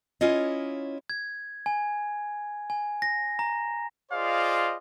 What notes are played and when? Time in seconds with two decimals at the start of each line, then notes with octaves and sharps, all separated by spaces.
0.21 C#4 E4 F4 C#5 D#5
1.10 G#6
1.66 G#5
2.70 G#5
3.02 A#6
3.39 A#5
4.12 F4 G#4 C5 D5 D#5 F5